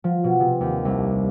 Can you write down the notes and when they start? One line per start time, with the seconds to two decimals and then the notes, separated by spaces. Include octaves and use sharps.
0.04 F3
0.24 B2
0.40 C3
0.61 D#2
0.85 C2